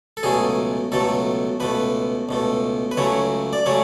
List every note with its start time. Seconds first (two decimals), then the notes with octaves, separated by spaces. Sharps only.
0.17 A4
0.23 C#2 B2 F#3 A3 G#4
0.92 C#2 B2 F#3 A3 A4
1.60 C#2 B2 A3 B4
2.29 C#2 B2 A3
2.91 B4
2.97 C#2 C#3 F#3 A3 C#5
3.53 D5
3.66 C#3 F#3 A3 C#5